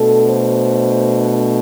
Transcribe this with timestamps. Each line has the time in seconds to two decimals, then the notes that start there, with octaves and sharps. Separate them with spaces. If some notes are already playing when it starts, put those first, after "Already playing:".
Already playing: B2 A3 D4 A4
0.28 C5